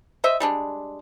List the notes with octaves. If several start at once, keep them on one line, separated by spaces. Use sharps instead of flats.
C5 D#5 E5
G3 G#3 D4